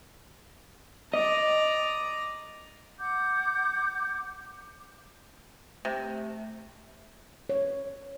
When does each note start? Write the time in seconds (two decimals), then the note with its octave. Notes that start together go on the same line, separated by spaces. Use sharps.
1.14 D5 D#5 A#5
2.98 F#5 D6 G6
5.85 C3 A3
7.49 C#5